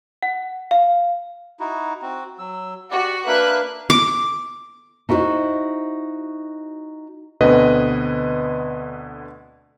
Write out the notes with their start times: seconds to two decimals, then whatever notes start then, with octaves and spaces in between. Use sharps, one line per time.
0.23 F#5
0.71 F5
1.60 D#4 E4 F#4
2.02 C4 F#4
2.39 F#3 E6
2.91 F#4 G4 D5
3.27 A#3 D4 A#4 B4 E5 F#6
3.90 D6
5.09 D#4 E4 F#4 A4 C5 D#5
7.41 D2 B2 D3 C4 B4 D#5